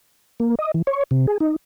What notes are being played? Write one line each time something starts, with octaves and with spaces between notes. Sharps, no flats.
A#3
D#5
E3
C#5
C3
G#4
D#4